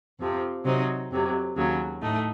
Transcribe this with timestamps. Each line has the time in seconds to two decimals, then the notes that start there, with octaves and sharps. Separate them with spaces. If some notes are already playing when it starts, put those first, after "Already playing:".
0.19 F2 C3 F3 C4
0.65 C3 F#3 C4 D#4
1.11 F2 C3 F#3
1.56 D#2 C#3 F#3
2.02 A2 A3 D#4